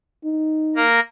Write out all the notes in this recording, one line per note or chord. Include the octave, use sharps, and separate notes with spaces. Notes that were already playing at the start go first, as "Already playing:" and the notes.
D#4
A#3 A#4